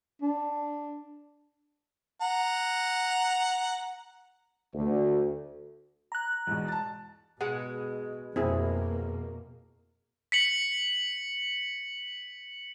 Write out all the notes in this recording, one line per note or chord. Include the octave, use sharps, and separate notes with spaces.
D4
F#5 A#5
D2
A#5 F#6
E2 G#2 B2
A5 A6
B2 G#3 F#5
F2 B2 A#3 C4 E4 G#4
B6 C#7 F#7